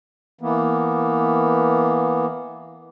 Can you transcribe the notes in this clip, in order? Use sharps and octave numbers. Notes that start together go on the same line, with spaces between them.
E3 A#3 B3